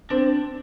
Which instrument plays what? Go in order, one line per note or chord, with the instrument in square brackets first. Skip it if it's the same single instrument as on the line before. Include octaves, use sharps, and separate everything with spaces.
[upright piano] C4 [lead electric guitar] D4